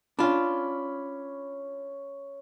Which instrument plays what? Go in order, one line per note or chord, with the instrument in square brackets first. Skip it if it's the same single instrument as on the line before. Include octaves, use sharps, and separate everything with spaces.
[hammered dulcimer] C#4 B5 [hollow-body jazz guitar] D4 F4